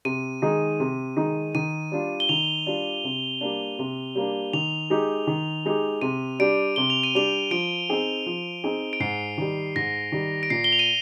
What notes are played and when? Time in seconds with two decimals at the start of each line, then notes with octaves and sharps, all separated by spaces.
0.05 C3 D#7
0.42 D#3 G#3 D#4
0.80 C3
1.16 D#3 G#3 D#4
1.55 D#3 D#7
1.91 G3 D4 F4
2.20 G7
2.29 D#3 F7
2.66 G3 D4 F4
3.04 C3
3.41 G3 A#3 D4
3.79 C3
4.15 G3 A#3 D4
4.53 D#3 F7
4.90 G#3 D#4 G4
5.27 D#3
5.65 G#3 D#4 G4
6.02 C3 D#7
6.39 G3 D4 G4 D7
6.76 C3 G7
6.90 F7
7.03 D#7
7.15 G3 D4 G4 F7
7.51 F3 D7
7.89 C4 D#4 G#4
8.26 F3
8.64 C4 D#4 G#4
8.93 D7
9.00 G#2 C7
9.38 D#3 G3
9.76 G#2 A#6
10.12 D#3 G3
10.43 D7
10.50 A#2 C7
10.64 G7
10.73 F7
10.79 D#7